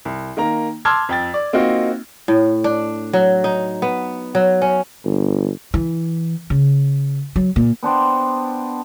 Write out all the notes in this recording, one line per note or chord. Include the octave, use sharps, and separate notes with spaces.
C2
D#3 A#3 A#5
A5 C6 D6 E6 F6 G#6
F2 G5 A6
D5
A#3 C4 D#4 F4 F#4
A2
D4
F#3
D#4
B3
F#3
C#4
G1
E3
C#3
F#3
A#2
B3 D4 C5 G5